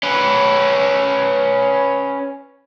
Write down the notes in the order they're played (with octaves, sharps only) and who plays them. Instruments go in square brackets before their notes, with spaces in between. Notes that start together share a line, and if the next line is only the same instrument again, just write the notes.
[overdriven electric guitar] C#4 B4